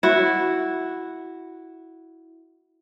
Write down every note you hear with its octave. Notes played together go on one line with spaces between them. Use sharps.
E4 F#4